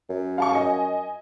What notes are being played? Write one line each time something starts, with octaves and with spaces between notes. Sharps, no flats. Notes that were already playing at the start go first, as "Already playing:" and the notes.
F#2
F5 A5 C#6
D#5 G#5